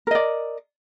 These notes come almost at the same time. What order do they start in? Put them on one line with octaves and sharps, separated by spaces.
A#4 D#5 D5